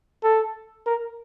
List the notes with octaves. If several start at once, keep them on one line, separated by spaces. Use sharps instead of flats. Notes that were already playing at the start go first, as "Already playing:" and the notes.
A4
A#4